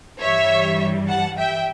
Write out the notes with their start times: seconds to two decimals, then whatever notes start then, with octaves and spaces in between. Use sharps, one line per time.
0.21 G2 E3 G3 C#5 E5
1.08 F#5 A5
1.38 E5 G5